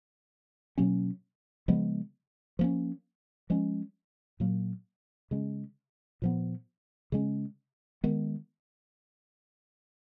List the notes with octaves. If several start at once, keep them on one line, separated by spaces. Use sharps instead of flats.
B2 F#3 A#3 C#4
C#3 F3 G#3 B3
F3 A#3 C#4
F3 G#3 C#4
A#2 F#3 A#3
C#3 G#3 C#4
A#2 F3 B3
C#3 G#3 C#4
D#3 G#3 B3